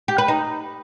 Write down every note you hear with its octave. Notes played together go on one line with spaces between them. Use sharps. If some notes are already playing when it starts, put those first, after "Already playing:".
G4
B4
D#4